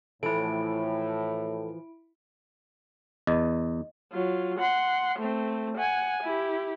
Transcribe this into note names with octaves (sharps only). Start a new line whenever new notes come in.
A2 E3 F3 E4 A4 D7
E2 D#5
F#3 F4
F#5 C6
A3 C4
F#5 G#5
E4 G4